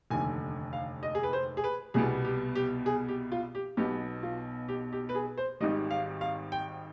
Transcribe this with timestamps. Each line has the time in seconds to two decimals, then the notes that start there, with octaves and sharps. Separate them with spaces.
0.10 F1 D#2 D3 G#5
0.73 F5
1.03 D#5
1.15 G#4
1.23 B4
1.33 C5
1.57 G#4
1.64 B4
1.94 C2 B2 G3 B3 G#4
2.25 G4
2.55 G4
2.86 G#4
3.08 G4
3.32 F4
3.55 G4
3.77 B1 B2 B3 G4
4.23 F4
4.68 G4
4.93 G4
5.09 B4
5.15 G#4
5.37 C5
5.61 G#1 G#2 D#3 G3 D#5
5.91 F5
6.21 F5
6.52 G5